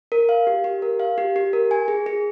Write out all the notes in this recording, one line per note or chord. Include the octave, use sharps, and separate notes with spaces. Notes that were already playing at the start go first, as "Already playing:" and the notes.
A#4
F5
G4
G4
A#4
F5
G4
G4
A#4
G#5
G#4
G#4